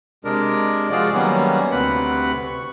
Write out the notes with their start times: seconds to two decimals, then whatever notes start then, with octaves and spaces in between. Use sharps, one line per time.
0.25 C3 G#3 D4 A#4
0.91 F3 G#3 F4 F#4 G#4 D5
1.14 D#3 F#3 G3 A#3 B3 C#4
1.71 D2 C3 C4 B4 F#5 B5
2.46 C#6